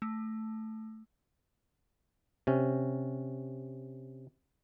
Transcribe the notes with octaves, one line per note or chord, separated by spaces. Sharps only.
A3
C3 C#4